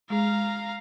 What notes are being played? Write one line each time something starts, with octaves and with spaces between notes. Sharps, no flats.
G#3 G#4 F5 A#5